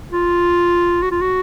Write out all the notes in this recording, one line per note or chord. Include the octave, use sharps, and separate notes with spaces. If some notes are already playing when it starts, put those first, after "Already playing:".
F4
F#4
F4
F#4